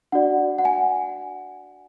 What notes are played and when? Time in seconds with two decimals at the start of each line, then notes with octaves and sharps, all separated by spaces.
0.12 D4 F#4 D5 F#5
0.59 F#5
0.65 G#5